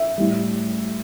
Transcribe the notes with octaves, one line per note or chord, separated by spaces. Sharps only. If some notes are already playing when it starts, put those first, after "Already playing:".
Already playing: E5
A2 G3